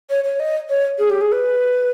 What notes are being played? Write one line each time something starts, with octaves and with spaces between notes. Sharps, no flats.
C#5
C#5
D#5
C#5
G#4
G4
G#4
B4